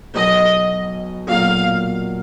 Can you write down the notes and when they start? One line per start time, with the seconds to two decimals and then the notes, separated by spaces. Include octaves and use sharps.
0.15 B1 B2 F#3 D#5
1.28 B1 A#2 F#3 A#3 F5